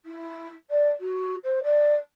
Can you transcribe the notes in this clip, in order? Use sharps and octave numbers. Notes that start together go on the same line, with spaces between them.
E4
D5
F#4
C5
D5